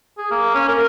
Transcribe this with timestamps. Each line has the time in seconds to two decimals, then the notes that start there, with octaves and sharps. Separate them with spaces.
0.18 G#4
0.31 A#3
0.54 C#4
0.68 A#4